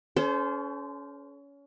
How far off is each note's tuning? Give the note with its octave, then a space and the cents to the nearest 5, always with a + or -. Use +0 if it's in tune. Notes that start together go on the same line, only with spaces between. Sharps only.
C#4 +25 A4 -40 C5 -20